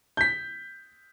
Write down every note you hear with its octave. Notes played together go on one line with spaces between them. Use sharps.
G6 B6